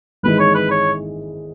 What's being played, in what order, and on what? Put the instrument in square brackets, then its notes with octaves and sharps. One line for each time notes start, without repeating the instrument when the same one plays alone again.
[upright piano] G#1 G#2 E3 G#3 [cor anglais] B4
[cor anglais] C#5
B4
C#5